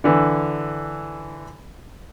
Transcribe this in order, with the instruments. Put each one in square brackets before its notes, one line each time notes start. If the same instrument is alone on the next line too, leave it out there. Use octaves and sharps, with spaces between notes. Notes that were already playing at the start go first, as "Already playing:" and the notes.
[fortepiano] D3 E3